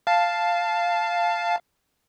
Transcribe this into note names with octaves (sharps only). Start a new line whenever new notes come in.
F5 A5